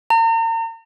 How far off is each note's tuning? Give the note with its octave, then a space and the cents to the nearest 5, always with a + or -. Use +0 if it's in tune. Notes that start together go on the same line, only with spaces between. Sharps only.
A#5 -40